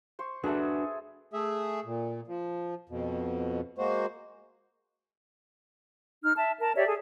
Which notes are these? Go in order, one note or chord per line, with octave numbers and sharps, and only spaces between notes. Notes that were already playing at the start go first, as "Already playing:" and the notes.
C5 C6 C#6
D4 F#4 G#4 A4 B4 E5
A3 G#4 E5
A#2
F3
F2 B2
G#3 A#3 F#4 C5
D#4 F6
E5 A5
A#4 A5
G4 C#5 D5 E5
G#4 A4